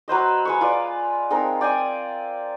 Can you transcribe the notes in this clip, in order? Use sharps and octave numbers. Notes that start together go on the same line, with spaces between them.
F#3 B4 C5 D#5
G#3 B4 C#6
F4 B4 D5
G#3 C4 D#4 A#4
D5 G5 G#5 D#6